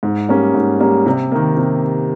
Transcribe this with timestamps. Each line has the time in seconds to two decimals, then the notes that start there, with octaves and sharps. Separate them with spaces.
0.03 G#2
0.29 G3 A#3 C#4
0.54 G#2
0.80 G3 A#3 C#4
1.06 C3
1.32 D#3 A#3
1.57 C3